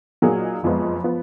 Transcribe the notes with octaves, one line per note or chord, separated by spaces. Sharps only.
A#2 F#3 A#3 D#4 G#4
F#1 F2 F3 G#3 B3
F3 B3